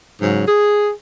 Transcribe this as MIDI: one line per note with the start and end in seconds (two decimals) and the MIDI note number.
0.20 0.46 44
0.20 0.46 49
0.20 0.46 54
0.47 0.90 68